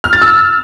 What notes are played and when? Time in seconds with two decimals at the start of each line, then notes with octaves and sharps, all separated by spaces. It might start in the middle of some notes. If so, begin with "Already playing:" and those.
0.04 F6
0.13 A6
0.22 E6